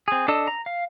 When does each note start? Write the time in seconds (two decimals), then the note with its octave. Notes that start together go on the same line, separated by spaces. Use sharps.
0.08 C4 G#4
0.28 D4 A4 D#5 A5 E6
0.48 A#5
0.66 F5